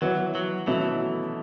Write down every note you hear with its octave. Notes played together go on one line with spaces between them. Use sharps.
E3 F#3 B3 F#4 C#5
F#3
B2 E3 F#3 A3 C#4 E4